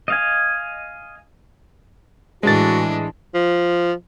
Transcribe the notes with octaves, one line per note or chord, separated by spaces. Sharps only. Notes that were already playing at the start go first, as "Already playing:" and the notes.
D#5 F5 G#5
A2 E3 G#3 D4 F#4 A6
F3